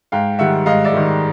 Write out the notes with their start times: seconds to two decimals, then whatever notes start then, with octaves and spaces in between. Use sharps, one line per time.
0.12 G#2 F5 G5
0.39 D#3 G3 E5 F#5
0.66 G#2 D#5 F5
0.84 D5 E5
0.93 D#3 G3